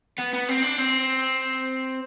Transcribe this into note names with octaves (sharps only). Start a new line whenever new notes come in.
B3
B3
C4
D4
C4